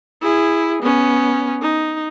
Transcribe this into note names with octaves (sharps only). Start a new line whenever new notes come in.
E4 G#4
B3 C#4
D#4